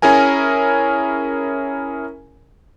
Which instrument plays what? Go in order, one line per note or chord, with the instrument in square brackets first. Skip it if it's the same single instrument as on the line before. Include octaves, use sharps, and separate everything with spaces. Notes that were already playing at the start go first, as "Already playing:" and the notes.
[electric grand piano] C#4 E4 G#4 A#4 G#5